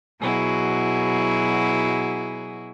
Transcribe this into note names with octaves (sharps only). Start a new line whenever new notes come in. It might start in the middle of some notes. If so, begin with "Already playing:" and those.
B2 F#3 E4 G#4